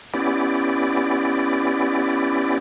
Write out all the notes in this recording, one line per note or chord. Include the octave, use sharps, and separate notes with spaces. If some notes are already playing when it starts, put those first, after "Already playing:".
B3 C#4 E4 G4 D5